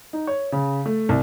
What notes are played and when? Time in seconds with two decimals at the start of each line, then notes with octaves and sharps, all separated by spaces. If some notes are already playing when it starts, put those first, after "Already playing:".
0.13 D#4
0.27 C#5
0.52 C#3
0.86 A3
1.09 C2